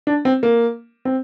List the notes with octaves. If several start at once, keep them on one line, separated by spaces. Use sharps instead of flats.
D4
C4
A#3
C4